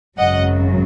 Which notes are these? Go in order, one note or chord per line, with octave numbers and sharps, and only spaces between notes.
G#1 F#2 C#3 F#3 D#5 F#5